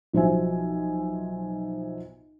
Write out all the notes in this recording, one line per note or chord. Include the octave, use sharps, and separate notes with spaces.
B1 F3 F#4 C5 E5 G#5